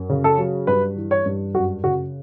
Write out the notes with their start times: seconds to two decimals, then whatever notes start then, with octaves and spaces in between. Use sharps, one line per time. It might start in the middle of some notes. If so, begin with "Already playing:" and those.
Already playing: F#2
0.09 C#3
0.24 A4
0.38 F#3
0.67 G2 B4
0.97 E3
1.11 C#5
1.26 G2
1.55 F#2 F#4
1.84 C#3 F#4